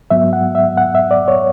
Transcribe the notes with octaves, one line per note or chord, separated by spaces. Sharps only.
G#2 F#3 B3 E5
F#5
E5
F#5
E5
D5
C#5